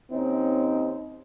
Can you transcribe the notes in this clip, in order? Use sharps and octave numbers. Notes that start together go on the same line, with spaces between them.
D#2 C4 C#4 D#4